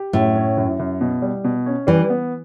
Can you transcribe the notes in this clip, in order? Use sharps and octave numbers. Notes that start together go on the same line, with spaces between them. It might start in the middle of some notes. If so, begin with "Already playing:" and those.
Already playing: G4
F#2 A2
C#4
F#2
F#2
B2
G3
B2
C#4
E3 G3
B3